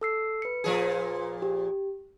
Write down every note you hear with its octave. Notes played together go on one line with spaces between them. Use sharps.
A4 E6 C7
B4 C#7
A#2 F3 G#4
G4